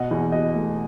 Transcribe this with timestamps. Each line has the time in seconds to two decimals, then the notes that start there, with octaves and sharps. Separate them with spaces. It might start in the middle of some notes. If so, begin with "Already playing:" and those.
Already playing: B2 D#5 F#5
0.11 E2
0.32 B2 D#5
0.54 A3